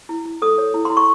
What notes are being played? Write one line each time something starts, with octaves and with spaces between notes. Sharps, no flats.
E4
E4
A4 D#6
C#5
E4
E4 C6
C#6